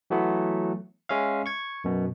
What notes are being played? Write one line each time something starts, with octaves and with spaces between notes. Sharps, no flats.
E3 F#3 A3 B3
G#3 C#4 E5 F5
C#6 G#6
F#2 B2